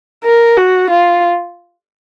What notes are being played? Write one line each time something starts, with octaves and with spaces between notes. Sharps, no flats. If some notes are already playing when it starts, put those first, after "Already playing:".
A#4
F#4
F4